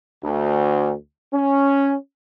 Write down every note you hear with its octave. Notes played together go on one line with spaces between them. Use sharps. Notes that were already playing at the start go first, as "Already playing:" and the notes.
D2
C#4